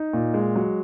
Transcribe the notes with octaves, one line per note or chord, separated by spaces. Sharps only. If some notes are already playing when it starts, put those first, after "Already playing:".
Already playing: D#4
A#2
G#3
F#3